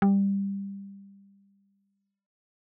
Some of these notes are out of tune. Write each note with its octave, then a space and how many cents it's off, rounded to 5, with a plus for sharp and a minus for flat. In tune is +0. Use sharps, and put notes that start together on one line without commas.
G3 +15